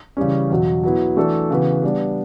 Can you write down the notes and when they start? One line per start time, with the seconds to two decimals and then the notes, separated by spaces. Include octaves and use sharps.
0.17 C#3 E3 G3 C#4
0.50 E2 B2 F#3
0.83 F#3 B3 E4
1.17 E3 A3 D4 F#4 A4
1.50 C#3 E3 B3 F#4 B4
1.83 G3 B3 D4